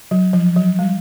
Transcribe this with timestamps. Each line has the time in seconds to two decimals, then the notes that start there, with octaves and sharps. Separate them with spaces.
0.11 F#3
0.33 F3
0.56 F#3
0.79 G3